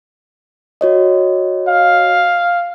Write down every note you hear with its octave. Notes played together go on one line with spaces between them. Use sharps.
F#4 C#5 D#5
F5